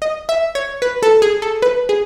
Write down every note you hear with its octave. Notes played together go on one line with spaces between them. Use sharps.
D#5
E5
C#5
B4
A4
G#4
A4
B4
G#4